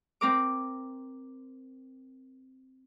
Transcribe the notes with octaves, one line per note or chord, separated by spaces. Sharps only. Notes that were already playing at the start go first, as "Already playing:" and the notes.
C4 A#4 D6